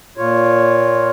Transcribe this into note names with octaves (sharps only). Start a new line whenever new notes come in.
A#2 F4 C#5